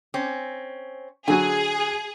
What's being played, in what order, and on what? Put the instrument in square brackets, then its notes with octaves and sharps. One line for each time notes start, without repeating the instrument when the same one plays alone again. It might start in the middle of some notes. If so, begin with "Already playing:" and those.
[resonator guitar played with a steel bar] C4 C#4
[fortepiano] D3 F#3 F#4 [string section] G#4 [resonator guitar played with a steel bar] G#5